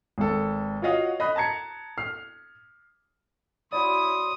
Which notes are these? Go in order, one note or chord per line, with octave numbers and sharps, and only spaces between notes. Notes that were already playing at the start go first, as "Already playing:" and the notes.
G#1 A4
F4 F#4 C#5 D#5 F5 F#5
D#5 B5 F#6
A5 A#5 G#6 C#7
F6 C7
E4 F#4 C#5 D5 B5 C6 D#6